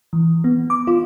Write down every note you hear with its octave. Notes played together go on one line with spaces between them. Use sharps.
E3
B3
D6
F4